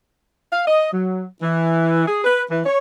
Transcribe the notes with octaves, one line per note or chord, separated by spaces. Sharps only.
F5
D#5
F#3
E3
G#4
B4
E3
C#5